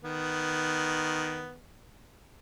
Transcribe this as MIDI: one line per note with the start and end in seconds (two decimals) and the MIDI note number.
0.04 1.56 51
0.04 1.56 59